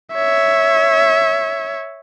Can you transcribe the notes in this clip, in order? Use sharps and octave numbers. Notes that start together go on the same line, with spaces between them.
C#5 E5